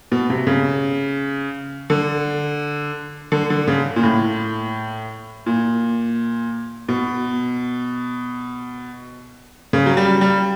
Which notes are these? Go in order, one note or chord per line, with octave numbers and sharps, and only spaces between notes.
B2
C3
C#3
D3
D3
D3
C#3
A#2
A2
A#2
B2
C#3
F#3
G3
G3